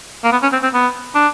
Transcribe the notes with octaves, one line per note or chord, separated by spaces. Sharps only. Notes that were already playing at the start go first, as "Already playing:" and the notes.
A#3
B3
C#4
C4
C4
B3
D4